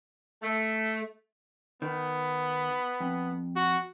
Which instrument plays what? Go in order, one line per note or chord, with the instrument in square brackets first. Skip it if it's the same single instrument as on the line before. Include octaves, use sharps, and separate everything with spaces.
[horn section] A3
[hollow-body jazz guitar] D#3 [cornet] B3
[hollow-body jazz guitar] F2
[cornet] F#4